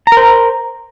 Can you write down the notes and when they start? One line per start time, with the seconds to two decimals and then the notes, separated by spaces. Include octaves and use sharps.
0.07 A#5
0.12 A#4
0.17 C5